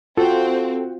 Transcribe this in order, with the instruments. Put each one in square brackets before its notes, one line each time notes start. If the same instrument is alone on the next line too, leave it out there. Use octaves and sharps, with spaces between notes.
[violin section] C4 [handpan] F4 [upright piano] F#4 [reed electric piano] A4